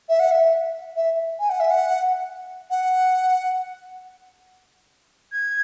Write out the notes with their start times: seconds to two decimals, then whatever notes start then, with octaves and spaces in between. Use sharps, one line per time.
0.09 E5
0.19 F#5
0.31 E5
0.96 E5
1.39 G#5
1.49 F#5
1.60 E5
1.70 F#5
2.70 F#5
5.32 G#6